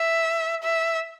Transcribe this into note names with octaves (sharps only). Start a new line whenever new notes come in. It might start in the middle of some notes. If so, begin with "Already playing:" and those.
Already playing: E5
E5